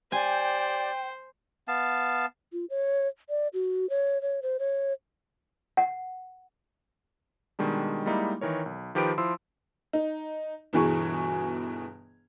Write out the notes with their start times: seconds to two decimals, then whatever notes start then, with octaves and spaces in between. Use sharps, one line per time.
0.12 G4 C5 D5 G5 G#5
1.68 B3 F5 A5
2.53 F4
2.70 C#5
3.29 D5
3.54 F#4
3.90 C#5
4.22 C#5
4.43 C5
4.59 C#5
5.77 F#5
7.59 B2 D#3 G3 G#3 D4
8.06 G3 G#3 A#3 D#4 E4
8.41 D#3 E3 A#4 C#5
8.66 B1
8.95 D#3 F3 G4 B4 B5 D7
9.18 F3 E4 C6 E6
9.93 D#4
10.73 G1 B2 E3 G#4 G#5 C#6